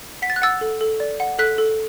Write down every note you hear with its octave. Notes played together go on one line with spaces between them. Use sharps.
F#5 B6
A6
F#6
F#5 E6 A6
A4
A4
D5
F#5
A4 F#6 B6
A4